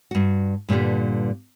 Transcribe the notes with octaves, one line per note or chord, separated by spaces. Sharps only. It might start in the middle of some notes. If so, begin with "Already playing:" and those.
G2 F#4
G2 A#2 D3 G3 B3